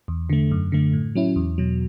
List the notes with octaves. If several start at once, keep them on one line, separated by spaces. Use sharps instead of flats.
E2
D3 A3
F#2
D3 A3
A2
F#3 C#4 E4
E2
B2 F#3